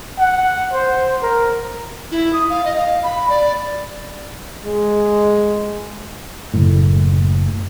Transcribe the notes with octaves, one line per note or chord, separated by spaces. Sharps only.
F#5
C5
A#4
E4
D#6
F5
D#5
F5
B5
D5
G#3
F#1 A2